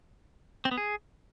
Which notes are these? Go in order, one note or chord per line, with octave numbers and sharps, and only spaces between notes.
C4
B3
G#4